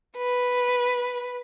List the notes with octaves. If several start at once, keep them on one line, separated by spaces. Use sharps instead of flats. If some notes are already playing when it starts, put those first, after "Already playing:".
B4